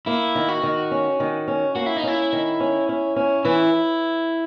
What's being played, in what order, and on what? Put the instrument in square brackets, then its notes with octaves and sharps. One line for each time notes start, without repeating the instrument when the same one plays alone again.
[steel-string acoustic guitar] A#3 [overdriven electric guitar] E4
[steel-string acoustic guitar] D#3
[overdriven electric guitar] F#4
[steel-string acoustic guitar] D#3
C#4
D#3
C#4
[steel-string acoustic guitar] A#3 [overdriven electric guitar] F#4
[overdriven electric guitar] E4
D#4
[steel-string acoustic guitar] C#4 [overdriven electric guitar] E4
[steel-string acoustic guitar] D#3
C#4
C#4
C#4
[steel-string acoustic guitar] E3 [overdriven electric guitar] E4